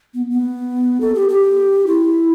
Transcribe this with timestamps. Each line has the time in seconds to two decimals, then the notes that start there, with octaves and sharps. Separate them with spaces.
0.14 B3
0.30 B3
1.01 A4
1.14 G4
1.29 G4
1.87 E4